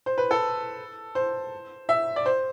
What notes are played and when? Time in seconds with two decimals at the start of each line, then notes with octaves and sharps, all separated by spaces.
0.06 C5
0.18 B4
0.31 A4
1.15 C5
1.89 E5
2.16 D5
2.26 C5